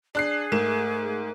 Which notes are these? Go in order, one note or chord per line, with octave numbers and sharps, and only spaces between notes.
D4 G#4 F#6 C7
G#2 A3 A#4 E7